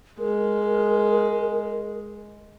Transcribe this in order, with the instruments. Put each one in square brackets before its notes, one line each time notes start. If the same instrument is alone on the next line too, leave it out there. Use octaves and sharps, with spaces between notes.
[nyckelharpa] G#3 [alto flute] A#4